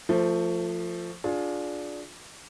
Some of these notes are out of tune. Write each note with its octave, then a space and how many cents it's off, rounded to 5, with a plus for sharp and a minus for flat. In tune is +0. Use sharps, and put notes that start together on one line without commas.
F3 +0 A3 +25
D4 -5 F4 +20 G#4 +20